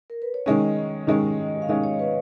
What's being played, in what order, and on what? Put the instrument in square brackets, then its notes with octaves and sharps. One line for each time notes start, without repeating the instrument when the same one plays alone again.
[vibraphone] A#4
B4
C#5
[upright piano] D#3 G#3 C#4 [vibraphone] D#5
[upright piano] D#3 G#3 C#4
[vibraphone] F5
[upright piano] D#3 G#3 C#4 [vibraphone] D#5
[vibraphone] C#5
B4